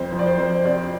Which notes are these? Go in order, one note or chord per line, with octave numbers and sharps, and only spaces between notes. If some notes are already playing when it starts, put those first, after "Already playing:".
Already playing: F2 C5
F3 C5
D5
C5
F2 C5
C3 D5